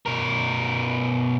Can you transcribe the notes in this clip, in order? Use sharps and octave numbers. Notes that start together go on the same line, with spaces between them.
B2 A#4